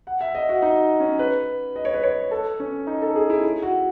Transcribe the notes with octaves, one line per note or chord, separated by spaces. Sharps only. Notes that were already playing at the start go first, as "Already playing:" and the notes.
F#5
E5
D#5
F#4
D#4
C#4
B4
D#5
C#5
B4
C#5
A4
C#4
D#4
A4
G#4
E4
E4
F#4